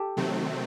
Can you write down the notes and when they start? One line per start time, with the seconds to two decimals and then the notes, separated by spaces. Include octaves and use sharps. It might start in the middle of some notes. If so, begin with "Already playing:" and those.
Already playing: G4 A4
0.17 C3 D#3 F#3 A3 C4